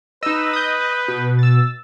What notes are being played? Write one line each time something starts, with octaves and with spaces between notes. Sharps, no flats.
D#4 B4 D#5 E6
D#6 G6
B2
E6 A6